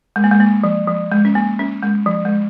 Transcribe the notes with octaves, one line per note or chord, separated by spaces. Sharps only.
G#3
A#3
G#3
A#3
F3
F3
G#3
C#4
A#3
C#4
G#3
F3
G#3